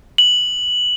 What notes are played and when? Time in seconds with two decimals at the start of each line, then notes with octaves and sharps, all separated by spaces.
0.18 F#7